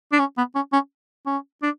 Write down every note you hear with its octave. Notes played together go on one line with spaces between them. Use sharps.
D4
C#4
B3
C#4
C#4
C#4
D4